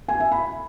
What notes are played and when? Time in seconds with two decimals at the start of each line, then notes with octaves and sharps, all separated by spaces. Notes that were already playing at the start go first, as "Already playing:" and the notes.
0.08 G#5
0.20 E5
0.32 B5